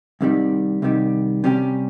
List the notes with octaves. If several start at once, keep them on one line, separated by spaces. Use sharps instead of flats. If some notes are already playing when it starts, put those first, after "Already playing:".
C2 C3 D#3 G3
C2 C3 D#3 G3
C3 G3 C#4 G4